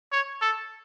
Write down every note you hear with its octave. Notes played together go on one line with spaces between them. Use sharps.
C#5
A4